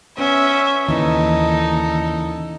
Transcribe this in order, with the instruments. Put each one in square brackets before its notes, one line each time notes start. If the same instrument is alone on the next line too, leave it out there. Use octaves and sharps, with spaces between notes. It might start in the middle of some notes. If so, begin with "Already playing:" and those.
[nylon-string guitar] B3 [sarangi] C#4 [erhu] E5
[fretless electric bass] D#2 [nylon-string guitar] A#2 C#3 E3 [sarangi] D#4 [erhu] A4